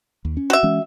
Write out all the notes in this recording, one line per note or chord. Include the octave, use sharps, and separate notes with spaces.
D#2
C#4
F#4 E5
E3 G#3 C#4